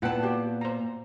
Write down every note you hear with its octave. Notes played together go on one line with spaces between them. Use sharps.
A#2 B3 E4 F#5 G5 A5
F#4 G4
C5 A#5